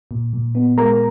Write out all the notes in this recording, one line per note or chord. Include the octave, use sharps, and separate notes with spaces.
A#2
A#2
B3
G#3 A#4 A#5